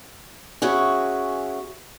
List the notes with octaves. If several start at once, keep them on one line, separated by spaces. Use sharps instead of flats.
C#4 E4 F#4 G#4